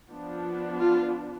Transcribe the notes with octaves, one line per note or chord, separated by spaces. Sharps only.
F3 B3 D4
F4